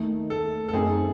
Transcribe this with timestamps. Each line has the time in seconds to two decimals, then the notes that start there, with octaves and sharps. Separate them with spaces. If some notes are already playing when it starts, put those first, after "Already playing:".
Already playing: D#2 D#3 A3 D#4
0.30 A4
0.69 A4
0.73 F#2 D#3 A3 C4 D#4 G#4